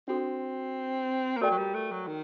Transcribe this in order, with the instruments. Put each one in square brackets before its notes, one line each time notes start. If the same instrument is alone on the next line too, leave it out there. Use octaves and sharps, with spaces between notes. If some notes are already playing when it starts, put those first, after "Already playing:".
[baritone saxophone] C4 [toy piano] D4 F#4 A4
[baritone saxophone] A#3
[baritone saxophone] A3 [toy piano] F#4 A#4 D5 G5 A#5
[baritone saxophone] F#3
G3
A3
F#3
D#3